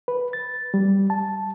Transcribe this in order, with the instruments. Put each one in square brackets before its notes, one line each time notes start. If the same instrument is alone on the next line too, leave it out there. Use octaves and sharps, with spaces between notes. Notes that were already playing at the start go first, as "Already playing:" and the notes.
[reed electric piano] B4
A6
G3
A5